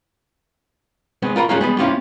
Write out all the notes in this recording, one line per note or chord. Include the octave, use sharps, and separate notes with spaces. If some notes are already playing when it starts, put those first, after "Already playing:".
G#3 B3 C4
F4 A#4 F#5 B5
G3 G#3 A#3 C#4 D#4 F4
G3 G#3 B3
A#3 C4 C#4 E4 F4 G4